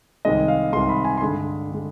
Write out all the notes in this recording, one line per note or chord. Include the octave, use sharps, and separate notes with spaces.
C2 C3 D#3 G#3 D#5
F5
C2 C3 D#3 G#3 C6
B5
G#5
C6
G2 D3 G#3 B5
D3 G#3